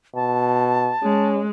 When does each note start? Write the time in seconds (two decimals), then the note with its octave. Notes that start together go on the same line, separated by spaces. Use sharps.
0.15 B2 A5
1.03 G#3 C#4